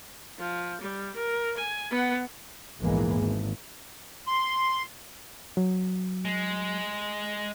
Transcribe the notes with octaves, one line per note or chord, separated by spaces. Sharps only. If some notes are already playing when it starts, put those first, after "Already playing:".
F3
G3
A#4
G#5
B3 F#5
A#1 E2 G#2 E3 G#3 A#3
G#1
C6
F#3
G#3